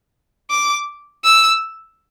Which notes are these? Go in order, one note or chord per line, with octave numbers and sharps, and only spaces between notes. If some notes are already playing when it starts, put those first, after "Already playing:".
D6
E6